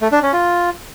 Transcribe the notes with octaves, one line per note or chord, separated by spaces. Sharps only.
A3
D4
C#4
F4